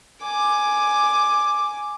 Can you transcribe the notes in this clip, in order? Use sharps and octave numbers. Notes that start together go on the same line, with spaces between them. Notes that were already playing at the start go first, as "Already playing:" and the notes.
G#5 D6